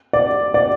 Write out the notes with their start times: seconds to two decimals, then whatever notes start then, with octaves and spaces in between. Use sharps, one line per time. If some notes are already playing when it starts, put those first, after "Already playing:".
0.13 D5
0.54 D5